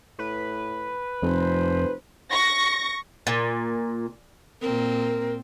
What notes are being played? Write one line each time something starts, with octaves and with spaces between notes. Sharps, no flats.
A2 B4
F1 F2 C5
C#6 A#6
A#2
A#2 C4 A#4